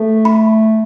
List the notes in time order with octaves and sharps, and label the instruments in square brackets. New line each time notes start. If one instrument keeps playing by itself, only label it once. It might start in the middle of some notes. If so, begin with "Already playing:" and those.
Already playing: [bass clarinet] A3 [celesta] A4
[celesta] B5